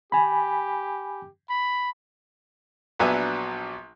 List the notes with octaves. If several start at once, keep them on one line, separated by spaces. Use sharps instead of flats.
G4 G#5 B5
B5
A#1 F#3 B3 D4 E5 G#5